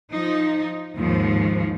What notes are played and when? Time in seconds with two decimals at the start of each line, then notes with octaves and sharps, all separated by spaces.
0.11 F3 D#4
0.97 D#2 G#2 F3